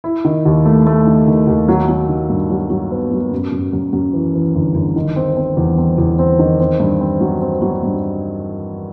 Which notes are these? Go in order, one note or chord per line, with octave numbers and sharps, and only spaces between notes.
E4
D#3
D#2
A3
A3
D#3
D#3
D#2
F#3
F#3
D#3
G2
F#3
F#3
B3
F#3
F#2
F#2
F#2
F#2
E3
E3
G1
G1
D#3
C4
C4
E2
C4
E2
C4
D#3
C4
G2
C4
F#3
C4
F#3
G2